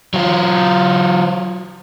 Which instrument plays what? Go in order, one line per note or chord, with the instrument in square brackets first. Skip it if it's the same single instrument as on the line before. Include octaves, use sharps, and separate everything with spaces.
[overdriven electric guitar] F#3 F4